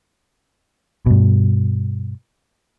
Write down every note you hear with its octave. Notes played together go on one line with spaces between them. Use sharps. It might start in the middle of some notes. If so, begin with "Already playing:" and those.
G2 B2